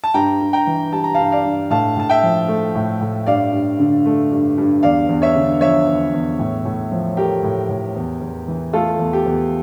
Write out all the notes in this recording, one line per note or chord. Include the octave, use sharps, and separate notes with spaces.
A5
G2 G5 A#5
G2
G5 A#5
E3
G3 A5
A#5
G2 F5 A5
D5 F5
G2
A2 F5 A5
A2 A5
E5 G5
F3
A3
A2
A2
G2 D5 F5
G2
D3
A3
G2
G2
E2 D5 F5
E2
C#5 E5
D3
F3 C#5 E5
E2
E2
A2
A2
F3
A3 G4 A#4
A2
A2
E2
E2
E3
A3 F4 A4
E2
G4
E2